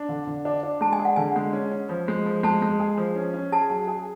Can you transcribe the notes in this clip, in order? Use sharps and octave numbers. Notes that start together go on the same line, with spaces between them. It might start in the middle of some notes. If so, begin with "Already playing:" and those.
Already playing: D4
D3
D3
D4
D4
G#3 A5
G#5
G#4
F#5
D3 G#5
G#3
C#4
C#4
F3
G#3
F3
G#3 A5
G#3
G#4
F3
C#4
C#4
G#4 A5
F#3
G#4